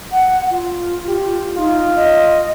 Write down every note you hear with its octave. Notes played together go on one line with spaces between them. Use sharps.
F#5
F4
G4
D#4 F4
D#5